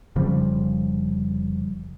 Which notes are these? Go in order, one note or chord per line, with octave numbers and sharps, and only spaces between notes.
F1 C#3 F3 G3